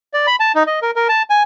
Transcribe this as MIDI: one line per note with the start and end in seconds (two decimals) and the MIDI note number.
0.14 0.26 74
0.27 0.36 83
0.40 0.52 81
0.55 0.63 63
0.67 0.79 75
0.82 0.91 70
0.96 1.08 70
1.09 1.22 81
1.30 1.43 80